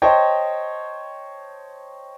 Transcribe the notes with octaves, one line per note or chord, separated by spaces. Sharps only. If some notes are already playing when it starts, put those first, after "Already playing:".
C5 C#5 D#5 G5 A5